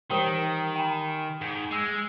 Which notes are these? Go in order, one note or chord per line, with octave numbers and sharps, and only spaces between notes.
D#3 E3 G4 G5
G5 G#5
G#2
G#3 E6 C7